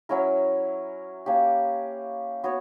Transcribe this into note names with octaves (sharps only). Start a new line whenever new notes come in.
F#3 C#4 E4 A#4
A#3 C#4 G4
B3 F#4 C#5